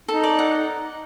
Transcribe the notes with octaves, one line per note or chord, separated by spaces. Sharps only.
D#4 A4
D5
F#5